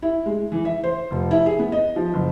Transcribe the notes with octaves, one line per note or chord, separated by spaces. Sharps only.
E4
G#3
E3
E5
C5
F1
E4
G#4
B3
D#5
F3
F#1